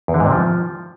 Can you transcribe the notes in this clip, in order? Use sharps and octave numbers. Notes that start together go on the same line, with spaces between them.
E2
D3
G#2
C3
F3